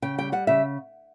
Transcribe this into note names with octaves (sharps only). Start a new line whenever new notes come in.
C#3 G5
G3 G5
G3 F#5
C#3 E5